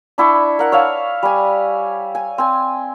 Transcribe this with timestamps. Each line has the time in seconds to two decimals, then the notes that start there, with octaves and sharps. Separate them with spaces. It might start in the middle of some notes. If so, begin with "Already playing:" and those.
0.18 D4 E4 G5 C#6
0.59 A#4 F#5
0.72 C#5 E5 F5 A5
1.23 G3 G#5
2.15 G#5
2.38 C4 G#5